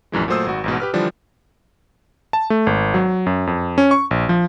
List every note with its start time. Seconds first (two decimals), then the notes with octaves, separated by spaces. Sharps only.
0.12 A#1 F#2 E3 G#3
0.28 A#2 F#3 A3 C5 D#6 E6
0.46 G#1 F#4
0.64 A1 G#2 B2
0.80 G4 B4 F6
0.93 D3 E3 F3 G3 D4
2.33 A5
2.50 A3
2.67 G#1
2.94 F#3
3.26 F#2
3.47 F2
3.78 C#4
3.91 C#6
4.11 A#1
4.29 F3